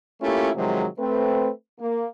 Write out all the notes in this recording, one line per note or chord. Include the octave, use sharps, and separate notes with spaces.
A3 A#3 C#4 E4 F4 G4
C3 D#3 F3 F#3 G#3
A3 C4 B4
A#3